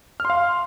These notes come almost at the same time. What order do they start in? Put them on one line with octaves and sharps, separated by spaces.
F6 C6 F5